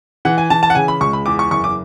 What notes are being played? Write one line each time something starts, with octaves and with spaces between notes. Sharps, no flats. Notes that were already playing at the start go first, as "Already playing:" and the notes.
E3 F#5
G#5
E3 A5
A5
F#5
C#3 G#5
B5
C#2 C#6
B5
E2 D6
C#6
F#1 C#6
D6